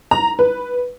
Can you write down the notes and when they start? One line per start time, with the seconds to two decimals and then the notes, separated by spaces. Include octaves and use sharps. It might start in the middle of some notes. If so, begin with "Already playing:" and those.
0.11 A#5
0.39 B4